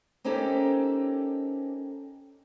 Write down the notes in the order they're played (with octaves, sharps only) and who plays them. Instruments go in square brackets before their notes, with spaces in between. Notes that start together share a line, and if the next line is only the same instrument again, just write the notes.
[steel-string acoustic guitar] A#3 C4 C#4 D#4 G4 A4